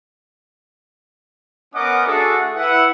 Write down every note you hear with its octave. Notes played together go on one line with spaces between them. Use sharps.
B3 C#4 A#4 D#5 F#5 D6
A3 D4 F#4 G#4 A4
E4 B4 E5 F#5